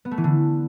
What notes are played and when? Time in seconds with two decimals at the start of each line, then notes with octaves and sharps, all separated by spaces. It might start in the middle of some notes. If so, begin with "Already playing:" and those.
0.05 B3
0.11 A3
0.18 E3
0.24 D3